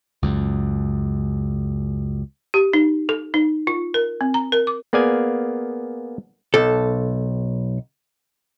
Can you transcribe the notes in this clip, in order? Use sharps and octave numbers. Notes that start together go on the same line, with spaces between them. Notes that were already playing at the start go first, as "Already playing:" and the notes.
C#2 F#2
G4
D#4
A4
D#4
F4
A#4
C4
A#5
A#4
D6
A#3 B3 G#4 D5 F5 G#5
B1 A4